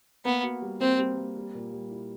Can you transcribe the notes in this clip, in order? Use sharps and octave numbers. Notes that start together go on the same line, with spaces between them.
A#3 B3
F#4
G3
A#3 C4
G3
A#3
G3
A#2
G3
E4